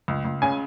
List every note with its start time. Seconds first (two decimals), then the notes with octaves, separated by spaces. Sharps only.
0.08 C#2
0.25 C#2
0.42 C#3 G#5